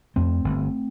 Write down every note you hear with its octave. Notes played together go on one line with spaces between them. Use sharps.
F2 A3 C4
G1